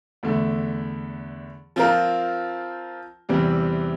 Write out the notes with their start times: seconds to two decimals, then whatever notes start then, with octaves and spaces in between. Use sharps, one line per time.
0.23 E2 D3 A3
1.76 F3 C4 F4 A#4
3.29 E2 C3 E3 G3 C4